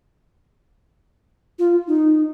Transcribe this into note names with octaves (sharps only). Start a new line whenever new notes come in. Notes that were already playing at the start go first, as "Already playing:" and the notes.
F4
D#4